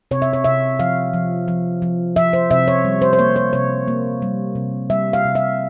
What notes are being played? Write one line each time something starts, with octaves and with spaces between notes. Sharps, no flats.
C3 C#5
E5
C#5
C3 E5
F3 F5
F3
F3
F3
F3 E5
C5
C3 E5
C#5
G3
C5
C5
A#3 C#5
C#5
C3 C#5
A#3
G3
C3
G3 E5
F5
C3
E5